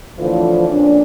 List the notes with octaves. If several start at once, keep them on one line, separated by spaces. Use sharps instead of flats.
A2 D3 E3 F3
F2 A#2 C#4 D4